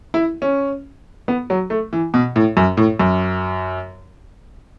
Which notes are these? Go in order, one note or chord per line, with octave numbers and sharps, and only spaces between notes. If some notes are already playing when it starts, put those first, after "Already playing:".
E4
C#4
B3
F#3
A3
E3
B2
A2
F#2
A2
F#2